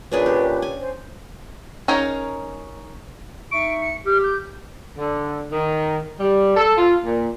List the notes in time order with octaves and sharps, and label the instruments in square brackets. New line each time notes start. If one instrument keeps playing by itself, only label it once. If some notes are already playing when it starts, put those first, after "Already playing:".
[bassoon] A#2 [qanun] C#4 D4 G#4 [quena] B4
[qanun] G4
G#5
[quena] C5
[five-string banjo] C#4 D#4 G#4 A#4
[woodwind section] D#4 E5 C#6 [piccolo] D7
[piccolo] C#7
[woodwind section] G4 [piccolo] F6
[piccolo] G6
[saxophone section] D3
D#3
G3
A4
F4
A#2